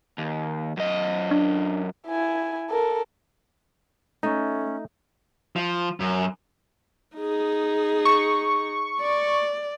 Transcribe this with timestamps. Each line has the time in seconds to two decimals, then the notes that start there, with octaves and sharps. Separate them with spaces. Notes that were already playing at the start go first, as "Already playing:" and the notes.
0.18 D#2
0.77 F#2 D#5
1.31 D4
2.07 E4 G#5
2.70 A4 A#4
4.23 A3 C#4 D#4
5.56 F3
6.00 F#2
7.17 D#4 G#4
8.05 C#6
9.01 D5